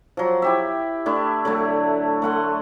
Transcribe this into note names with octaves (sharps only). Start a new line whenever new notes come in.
F3 F#3
E4 G4 E5
A3 D4 E4
D3 F#3 A3
A3 F#5 C6